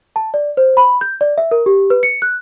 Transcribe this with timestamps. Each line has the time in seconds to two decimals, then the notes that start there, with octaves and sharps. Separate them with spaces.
0.16 A5
0.34 D5
0.57 C5
0.77 B5
1.01 G6
1.21 D5
1.38 E5
1.51 A#4
1.66 G4
1.90 B4
2.03 C#7
2.22 F#6